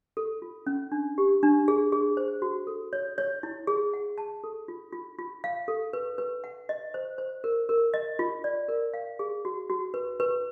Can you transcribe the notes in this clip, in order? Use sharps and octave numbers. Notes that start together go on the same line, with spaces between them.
A4
F4
C#4
D4
G4
D4
G#4
G#4
C5
F#4
A4
C#5
C#5
E4
G#4
F#5
A5
A4
F4
F4
F4
F5
A4
B4
B4
F#5
D#5
C5
C5
A#4
A#4
D#5
F4
D5
A#4
F5
G#4
F#4
F#4
B4
B4